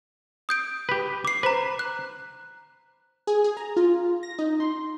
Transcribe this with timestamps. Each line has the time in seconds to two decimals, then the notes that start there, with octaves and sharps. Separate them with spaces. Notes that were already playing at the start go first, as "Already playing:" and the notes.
0.49 D#6 G6 D7
0.89 G4 B4
1.25 D6 C7
1.43 B4 C5 A#5
1.79 F#6
3.27 G#4
3.44 G#4
3.57 A#5
3.77 F4
4.23 A#6
4.39 D#4
4.60 C6